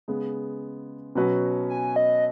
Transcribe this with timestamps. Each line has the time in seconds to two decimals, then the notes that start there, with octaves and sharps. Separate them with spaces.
0.08 C#3 G#3 B3
1.15 B2 F#3 C#4 F#4 B4
1.69 G#5
1.96 D#5